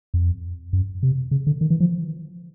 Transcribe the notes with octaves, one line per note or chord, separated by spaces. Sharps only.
F2
F#2
C3
C#3
D3
D#3
E3
F3